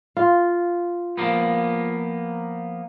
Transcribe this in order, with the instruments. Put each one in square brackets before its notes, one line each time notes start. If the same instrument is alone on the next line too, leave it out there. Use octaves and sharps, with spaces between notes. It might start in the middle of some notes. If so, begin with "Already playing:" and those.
[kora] F4
[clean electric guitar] F3 A#3 B3